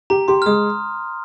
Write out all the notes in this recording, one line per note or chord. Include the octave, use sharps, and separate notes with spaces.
G4 A#5
G4 C6
F6
G#3 D#6